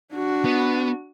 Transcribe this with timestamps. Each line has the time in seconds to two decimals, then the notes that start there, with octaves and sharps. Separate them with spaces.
0.14 D4 F#4
0.45 B3